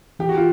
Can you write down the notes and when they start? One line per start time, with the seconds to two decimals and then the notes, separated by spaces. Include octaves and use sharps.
0.19 E3 G4
0.29 F#4
0.37 F4